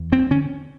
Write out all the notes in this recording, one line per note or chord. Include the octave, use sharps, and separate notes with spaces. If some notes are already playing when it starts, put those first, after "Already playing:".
Already playing: E2
F2 C4
D3 C#4